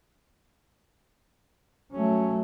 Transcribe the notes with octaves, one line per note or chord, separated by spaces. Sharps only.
F#3 A3 C#4